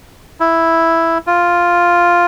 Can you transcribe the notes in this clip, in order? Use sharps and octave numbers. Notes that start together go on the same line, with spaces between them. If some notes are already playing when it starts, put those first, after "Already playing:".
E4
F4